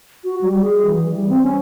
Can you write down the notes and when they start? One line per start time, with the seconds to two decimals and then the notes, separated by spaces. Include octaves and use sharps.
0.24 F#4
0.42 G3
0.61 G#4
0.86 E3
1.09 G3
1.29 C4
1.42 C#4